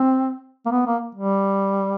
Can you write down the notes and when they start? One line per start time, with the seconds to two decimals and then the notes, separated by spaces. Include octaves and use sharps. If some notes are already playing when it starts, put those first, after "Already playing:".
Already playing: C4
0.66 A#3
0.72 B3
0.87 A#3
1.15 G3